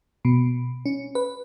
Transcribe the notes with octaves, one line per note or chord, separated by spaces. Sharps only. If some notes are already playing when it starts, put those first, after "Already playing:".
B2
C#4
B4